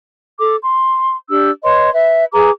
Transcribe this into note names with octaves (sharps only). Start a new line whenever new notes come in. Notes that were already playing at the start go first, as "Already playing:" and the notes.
A4 D6
C6
D4 G4 E6
B4 C#5 D#5 C6
B4 E5
G#4 B4 A#5 D6